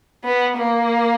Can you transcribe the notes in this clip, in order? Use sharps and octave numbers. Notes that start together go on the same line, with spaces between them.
B3
A#3